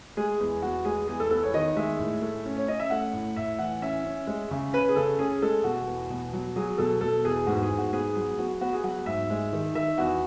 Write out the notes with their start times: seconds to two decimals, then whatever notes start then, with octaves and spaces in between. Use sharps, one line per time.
0.17 G#3 G#4
0.40 E2
0.62 E2 F#4
0.85 G#3 G#4
1.08 E2 G#4
1.20 A4
1.30 B3 A4
1.43 C#5
1.54 D#3 D#5
1.76 G#3 E5
1.99 A2
2.22 A3
2.45 C#4
2.57 C#5
2.68 C#4 D#5
2.79 E5
2.90 A3 F#5
3.13 A2
3.36 A2 E5
3.59 E3 F#5
3.82 C#4 E5
4.05 C#4
4.27 G#3
4.51 C#3
4.73 C#4 B4
4.89 G#4
4.96 C#3 A4
5.19 C#4 G#4
5.42 G#3 A4
5.64 B2 F#4
5.87 E2
6.10 B2
6.33 F#3
6.56 F#3 G#4
6.78 B2 A4
7.01 B2 A4
7.24 E2 G#4
7.47 G#2 F#4
7.63 G#4
7.70 G#2
7.78 F#4
7.93 B3 G#4
8.16 F#3
8.38 B3 F#4
8.61 B3 F#4
8.73 G#4
8.84 F#3 F#5
9.06 G#2 E5
9.30 G#3
9.53 D#3
9.75 D#3 E5
9.98 E2 F#4